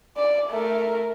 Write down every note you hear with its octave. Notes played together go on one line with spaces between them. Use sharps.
D5
A3 A#4